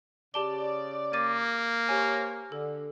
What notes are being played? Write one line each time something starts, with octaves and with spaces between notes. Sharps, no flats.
C#3 G4 D5 A5 G7
A#3 D6 A6 D#7
G4 C5 C#5 G#5
D3 A4